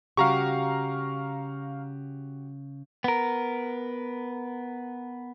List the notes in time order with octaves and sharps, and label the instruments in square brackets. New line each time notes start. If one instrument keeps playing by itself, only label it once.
[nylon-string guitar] C#3 G3 [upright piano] F#4 G4 [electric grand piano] F5 A#5 C#6
[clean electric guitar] B3 A#4